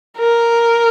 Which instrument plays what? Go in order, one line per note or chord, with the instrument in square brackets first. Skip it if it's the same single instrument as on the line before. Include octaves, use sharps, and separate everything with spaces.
[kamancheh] A#4